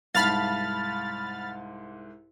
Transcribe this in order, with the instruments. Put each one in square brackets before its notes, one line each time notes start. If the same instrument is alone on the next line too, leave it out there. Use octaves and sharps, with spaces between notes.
[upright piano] C2 G#2 [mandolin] F5 A5 [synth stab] B5 F6 A6